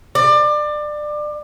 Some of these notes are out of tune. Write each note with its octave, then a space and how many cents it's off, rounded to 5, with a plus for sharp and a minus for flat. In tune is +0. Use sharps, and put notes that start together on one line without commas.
D5 +25